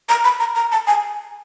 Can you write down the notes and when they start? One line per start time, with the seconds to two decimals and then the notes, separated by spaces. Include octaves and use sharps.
0.09 A#5
0.24 B5
0.40 A#5
0.55 A#5
0.72 A5
0.87 G#5